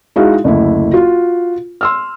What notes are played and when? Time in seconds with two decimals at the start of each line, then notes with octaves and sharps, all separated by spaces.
0.16 G#3 D#4 E4 F#4 F5
0.44 F#1 D2 E4
0.93 F4 F#4
1.81 C6 E6 F6